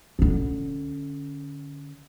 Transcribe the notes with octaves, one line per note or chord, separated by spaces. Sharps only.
D3 C#4